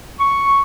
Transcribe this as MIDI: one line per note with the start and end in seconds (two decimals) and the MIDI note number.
0.20 0.61 85